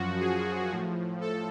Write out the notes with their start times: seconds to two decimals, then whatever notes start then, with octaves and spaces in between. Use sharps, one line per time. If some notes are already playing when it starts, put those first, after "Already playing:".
Already playing: F#2 F3 F#4
0.20 G#4
0.71 A2 F3
1.21 A4